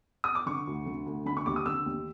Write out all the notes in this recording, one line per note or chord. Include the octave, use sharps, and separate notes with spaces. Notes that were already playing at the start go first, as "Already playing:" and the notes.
D#6
D6
D3 C#6
D2
D3
D2
D3 B5
C#6
D#2 D6
D#6
D3 E6
D#2